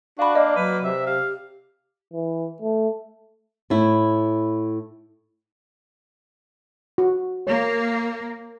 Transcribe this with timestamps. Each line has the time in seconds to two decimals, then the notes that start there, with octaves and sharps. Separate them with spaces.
0.19 D4 F#4 F5 B5
0.35 A#3 D5 D#5
0.56 F#3 B4
0.84 C3 E5
1.06 G4 F5
2.13 E3
2.62 A3
3.70 A2 E4
6.98 F#4
7.47 A#3 C#5